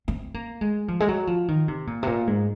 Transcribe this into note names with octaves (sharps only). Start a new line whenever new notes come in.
C4
A#3
G#3
F3
G#3
F#3
F3
D#3
C3
A#2
C3
A#2
G#2